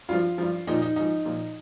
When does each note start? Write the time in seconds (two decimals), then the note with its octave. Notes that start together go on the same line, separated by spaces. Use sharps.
0.09 G2 F3 F4
0.38 G2 F3
0.67 A#2 F3 D#4
0.82 D#4
0.96 G#2 F3 D#4
1.25 A#2 F3